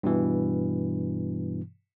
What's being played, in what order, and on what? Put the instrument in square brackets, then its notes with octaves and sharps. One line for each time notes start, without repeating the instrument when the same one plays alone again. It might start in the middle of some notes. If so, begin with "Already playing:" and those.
[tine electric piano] G2 B2 E3